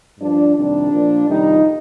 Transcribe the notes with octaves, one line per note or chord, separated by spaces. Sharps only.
G2 F3 D4
F2 C3 D#3 G3 D4
A#2 F3
F2 C3 D#3 G3 D#4